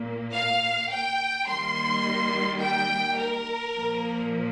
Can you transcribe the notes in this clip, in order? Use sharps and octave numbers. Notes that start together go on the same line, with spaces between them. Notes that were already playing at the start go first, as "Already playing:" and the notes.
Already playing: A#2 A#3
F5
G5
D#3 G3 A#3 C6
G5
A#4
A#2 F3 A#3